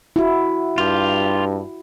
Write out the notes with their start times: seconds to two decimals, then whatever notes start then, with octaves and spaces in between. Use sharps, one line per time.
0.16 E4 F#4
0.78 G2 F4 G4